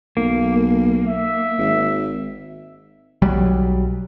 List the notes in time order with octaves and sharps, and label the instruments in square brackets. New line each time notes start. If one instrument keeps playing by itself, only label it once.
[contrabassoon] B1 [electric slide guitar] A#3
[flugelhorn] E5
[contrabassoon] G#1
[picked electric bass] B1 F#3 G3